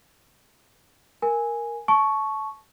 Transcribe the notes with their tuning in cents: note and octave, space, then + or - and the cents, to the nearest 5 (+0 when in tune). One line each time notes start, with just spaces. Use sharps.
A#4 +0 G#5 +0
A5 -20 C#6 +0